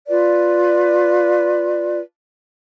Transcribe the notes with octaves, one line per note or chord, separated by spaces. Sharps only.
F4 B4 D5